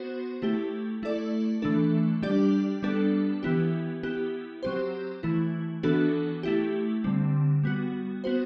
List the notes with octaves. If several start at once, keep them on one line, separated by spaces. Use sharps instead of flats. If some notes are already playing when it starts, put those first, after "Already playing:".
Already playing: B3 F#4 C5
A3 E4 G4
A3 E4 A4 D5
E3 A3 D4 A4
G3 D4 G4 D5
G3 B3 D4 A4
E3 B3 E4 G4
B3 E4 G4
F#3 C4 G4 C5
E3 A3 E4
E3 B3 D4 F#4 A4
A3 E4 G4
D3 G3 C4
G3 B3 F#4
B3 F#4 C5